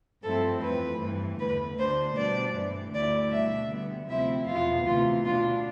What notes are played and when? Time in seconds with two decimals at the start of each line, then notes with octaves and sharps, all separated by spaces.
0.23 G2 F3 A3 C4 E4 A4
0.62 F2 E3 A3 B4
1.00 G2 E3 A3
1.39 E2 D3 A3 B4
1.77 D2 D3 A3 D4 C5
2.16 B2 G3 B3 D4 D5
2.54 G2 E3 A3
2.93 D2 D3 A3 E4 D5
3.31 B2 G3 D4 E5
3.70 D3 G3 B3
4.09 D2 C3 F3 C4 E4 E5
4.46 E2 B2 B3 F4
4.85 D2 C3 E3 F4
5.24 B2 B3 D4 F4